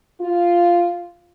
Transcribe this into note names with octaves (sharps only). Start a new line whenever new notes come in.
F4